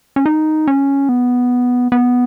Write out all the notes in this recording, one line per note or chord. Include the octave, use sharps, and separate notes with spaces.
C#4
D#4
C#4
B3
B3